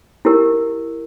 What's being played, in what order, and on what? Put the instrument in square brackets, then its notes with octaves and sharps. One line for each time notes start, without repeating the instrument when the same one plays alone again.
[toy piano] E4 G4 A#4